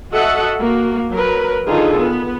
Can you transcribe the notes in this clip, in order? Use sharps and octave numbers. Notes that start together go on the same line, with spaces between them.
F#4 A4 D#5 E5 F#5
A#3 F#4
F#3 A#4 B4
D3 D#3 D#4 F4 G#4 A4
B3